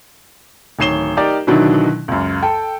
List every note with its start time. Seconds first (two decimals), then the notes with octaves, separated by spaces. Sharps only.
0.79 D1 D#3 C#5 C7 E7 G7
1.17 D#4 G4 A#4 D5
1.47 B2 D3 D#3 F#3 D4 E4
2.08 C#2 F#2
2.42 A4 G5